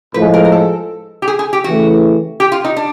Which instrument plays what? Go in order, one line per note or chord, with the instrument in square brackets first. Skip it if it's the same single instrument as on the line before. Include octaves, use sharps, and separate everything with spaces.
[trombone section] A2 F3 G#3 [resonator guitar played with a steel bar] B4
[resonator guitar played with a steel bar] A#4
A#4
A4
G4
G#4
G#4
G4
[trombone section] C#3 E3 A3 [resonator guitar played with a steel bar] F#4
[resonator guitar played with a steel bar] G4
F4
D#4
D4